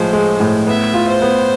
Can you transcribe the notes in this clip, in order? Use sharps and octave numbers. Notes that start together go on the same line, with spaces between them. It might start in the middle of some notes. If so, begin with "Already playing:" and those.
Already playing: A2 F3 G#3 C5
G#3
A2
B3 E5
F4
C5
B3